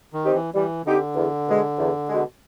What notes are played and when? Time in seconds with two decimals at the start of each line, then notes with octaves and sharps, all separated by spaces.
0.13 D#3
0.24 C4 D#4 G4
0.34 E3
0.54 E3 G3
0.85 D3 C4 D#4 G4
1.15 E2
1.47 B2 G#3
1.78 E2
2.09 B2 G#3